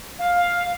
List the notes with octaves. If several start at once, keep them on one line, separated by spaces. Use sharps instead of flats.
F5